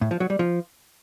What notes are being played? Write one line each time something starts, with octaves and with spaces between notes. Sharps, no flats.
A2
F3
F#3
G3
F3